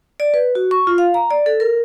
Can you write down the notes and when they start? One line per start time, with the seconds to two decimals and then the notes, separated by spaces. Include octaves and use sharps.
0.20 D5
0.34 B4
0.55 F#4
0.71 C#6
0.87 F4
0.98 F5
1.14 A#5
1.31 D5
1.46 A4
1.60 A#4